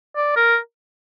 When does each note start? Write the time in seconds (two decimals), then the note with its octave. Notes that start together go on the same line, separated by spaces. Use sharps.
0.16 D5
0.36 A#4